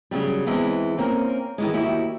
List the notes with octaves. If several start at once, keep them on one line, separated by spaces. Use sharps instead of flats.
C#3 E3 F#3 G3
E2 E3 G#3 C4
A#3 C4 C#4 A#4
D#3 E3 G#3
D#2 E4 F#4 G4